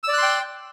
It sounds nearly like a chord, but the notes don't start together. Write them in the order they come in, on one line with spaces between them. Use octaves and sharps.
E6 D5 F#6 C6 G5